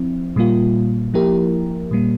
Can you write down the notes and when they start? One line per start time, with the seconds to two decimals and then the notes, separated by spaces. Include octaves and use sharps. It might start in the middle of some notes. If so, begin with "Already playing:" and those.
Already playing: F3 C4 E4
0.36 A#2 G3 A#3 F4
1.14 F3 A#3 E4 G4 A#4
1.91 A#2 G3 A#3